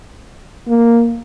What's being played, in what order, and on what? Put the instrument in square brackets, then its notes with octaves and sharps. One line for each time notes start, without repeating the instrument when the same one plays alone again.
[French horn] A#3